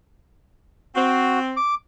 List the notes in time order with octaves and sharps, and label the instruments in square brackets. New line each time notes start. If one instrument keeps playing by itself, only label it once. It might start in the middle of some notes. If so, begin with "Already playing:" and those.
[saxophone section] C4 [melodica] F#4
[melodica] D6